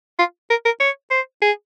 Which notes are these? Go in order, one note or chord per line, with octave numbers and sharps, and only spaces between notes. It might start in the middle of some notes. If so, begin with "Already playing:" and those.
F4
A#4
A#4
C#5
C5
G#4